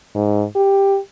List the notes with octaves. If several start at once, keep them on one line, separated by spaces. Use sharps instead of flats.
G#2
G4